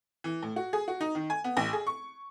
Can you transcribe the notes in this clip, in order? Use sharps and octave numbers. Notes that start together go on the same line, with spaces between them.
E3
A2
F#4
G#4
F#4
D#4
D#3
G#5
B3
A1
G#4
C#6